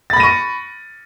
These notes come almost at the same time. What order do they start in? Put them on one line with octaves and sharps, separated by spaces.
A6 B5 A#6 D#7 C#6